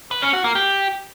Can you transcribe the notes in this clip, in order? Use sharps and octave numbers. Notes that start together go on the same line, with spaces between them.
B4
C#4
F#4
A#3
G4